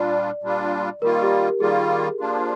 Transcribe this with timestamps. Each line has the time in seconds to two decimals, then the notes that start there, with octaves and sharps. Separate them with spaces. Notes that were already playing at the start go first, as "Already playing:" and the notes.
Already playing: A#2 G3 D4 F4 D5
0.42 A#2 G3 D4 F4
1.02 D#3 G3 A#3 F4 A#4
1.22 G4
1.60 D#3 G3 A#3 F4 G#4
2.20 F3 A#3 D4 F4